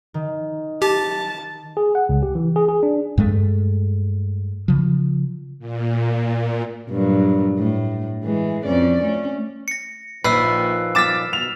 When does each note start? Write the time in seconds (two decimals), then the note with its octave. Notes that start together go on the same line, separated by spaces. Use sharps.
0.14 D#3
0.82 G4 A5
1.77 G#4
1.95 F#5
2.09 C#2
2.23 G4
2.35 E3
2.56 G#4
2.69 G#4
2.83 D4
3.18 G2 G#3 A3
4.68 C#3 F3
5.59 A#2
6.90 G2 A#2 F#3
7.58 A2
8.23 E3 G#3
8.65 F2 C#4 D5
9.02 A3 C#4
9.68 A#6 C#7
10.24 A#1 A#2 D#3 F3 B4 E6 F#6 C7
10.95 D6 F6 A6 B6 E7
11.33 B2 F7